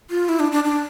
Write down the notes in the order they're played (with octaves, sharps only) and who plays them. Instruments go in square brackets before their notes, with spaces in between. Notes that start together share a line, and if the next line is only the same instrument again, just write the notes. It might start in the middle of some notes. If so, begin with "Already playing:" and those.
[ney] F4
E4
D4
D4
D4